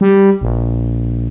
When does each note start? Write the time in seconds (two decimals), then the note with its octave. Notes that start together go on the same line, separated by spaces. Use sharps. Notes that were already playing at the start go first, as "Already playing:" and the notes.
0.01 G3
0.41 A#1